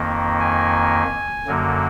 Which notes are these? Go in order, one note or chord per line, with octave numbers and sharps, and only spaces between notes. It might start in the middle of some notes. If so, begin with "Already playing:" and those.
Already playing: F2 D#3 A#3
G#5
F#2 D3 F#3 A#3